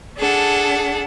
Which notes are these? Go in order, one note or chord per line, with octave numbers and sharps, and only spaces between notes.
D4 G#4 A4 F#5